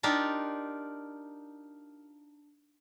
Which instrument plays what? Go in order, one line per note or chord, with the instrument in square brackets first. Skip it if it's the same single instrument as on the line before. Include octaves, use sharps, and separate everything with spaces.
[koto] D4 D#4 F4 G4 A#4